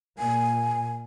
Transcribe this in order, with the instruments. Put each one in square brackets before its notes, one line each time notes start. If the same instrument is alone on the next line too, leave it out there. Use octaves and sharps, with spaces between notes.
[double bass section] A#2 [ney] G#5